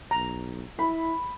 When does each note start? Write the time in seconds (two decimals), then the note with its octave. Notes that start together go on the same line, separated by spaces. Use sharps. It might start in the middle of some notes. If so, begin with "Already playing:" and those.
0.11 B1 A#5
0.79 E4 B5